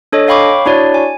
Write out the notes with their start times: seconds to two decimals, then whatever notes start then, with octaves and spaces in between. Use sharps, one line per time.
0.12 D4 A4 C#5 D#5
0.28 C#5 F5 G5 B5 C#6 D6
0.66 D4 E4 F#4 C#5 D5
0.94 G#5